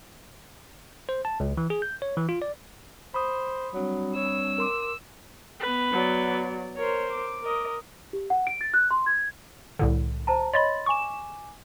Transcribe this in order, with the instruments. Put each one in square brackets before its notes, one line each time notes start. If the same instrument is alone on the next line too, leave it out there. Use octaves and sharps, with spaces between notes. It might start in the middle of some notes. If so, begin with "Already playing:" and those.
[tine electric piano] C5
A5
C#2
E3
G#4
G6
C#5
E3
F4
D5
[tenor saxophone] C5 [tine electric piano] B5 D#6
[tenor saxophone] F#3 [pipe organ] G3 C4 D4
[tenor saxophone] C#5 [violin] E6
[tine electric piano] A#4 C6 D6
[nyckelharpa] B3 B4
[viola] F#3 D5
[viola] A#4 C5 [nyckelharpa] C#5
[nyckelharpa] D6
[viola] A#4 D#5
[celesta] G4
F#5
D7
A6
F#6
C6
G#6
[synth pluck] C2 A2 D3
[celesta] C5 A5 A#5
[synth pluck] C#5 D#5 B5 [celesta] C6 A6
[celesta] G#5 D6 [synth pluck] C#6 E7